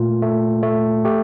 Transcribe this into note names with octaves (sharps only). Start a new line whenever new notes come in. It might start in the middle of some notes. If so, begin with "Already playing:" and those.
Already playing: A#2 A3 F4
A3
A3
A3 G4